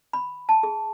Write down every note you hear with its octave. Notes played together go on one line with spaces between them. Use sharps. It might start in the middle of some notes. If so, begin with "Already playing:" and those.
B5
A5
G#4